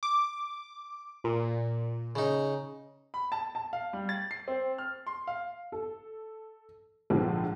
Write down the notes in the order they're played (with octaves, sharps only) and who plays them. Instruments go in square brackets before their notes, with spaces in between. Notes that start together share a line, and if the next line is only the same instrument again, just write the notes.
[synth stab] D6
A#2
[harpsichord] C#3 D#4
[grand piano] B5
A5
A5
F5
G3
A6
C7
C4
F6
C6
F5
[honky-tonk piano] A4
A#1 G#2 D3 F3